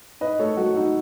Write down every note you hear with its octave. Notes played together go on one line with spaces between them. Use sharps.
G#2 B4 D#5
A3 A4 C#5
F#3 F#4 A4
G#2 D#4 F#4